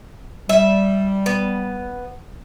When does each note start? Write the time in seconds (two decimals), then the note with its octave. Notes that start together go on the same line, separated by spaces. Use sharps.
0.49 G3 E5
1.26 B3